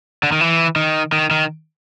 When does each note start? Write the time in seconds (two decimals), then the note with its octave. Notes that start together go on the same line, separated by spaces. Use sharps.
0.23 D3
0.32 D#3
0.41 E3
0.76 D#3
1.12 D#3
1.31 D#3